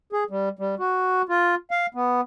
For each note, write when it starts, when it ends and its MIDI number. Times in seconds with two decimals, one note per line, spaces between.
0.13 0.24 68
0.30 0.49 55
0.59 0.75 55
0.79 1.22 66
1.29 1.55 65
1.71 1.86 77
1.94 2.21 59